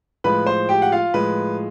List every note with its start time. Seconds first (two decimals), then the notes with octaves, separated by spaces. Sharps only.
0.24 A2 F3 G#3 B4 B5
0.46 C5 C6
0.69 G4 G5
0.82 F#5
0.92 F4 F5
1.14 A2 F3 G#3 B4